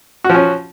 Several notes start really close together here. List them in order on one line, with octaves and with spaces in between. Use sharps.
F#4 F3 C#4